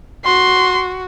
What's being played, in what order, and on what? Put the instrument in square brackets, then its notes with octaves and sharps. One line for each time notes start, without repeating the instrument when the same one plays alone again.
[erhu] F#4 [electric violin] C6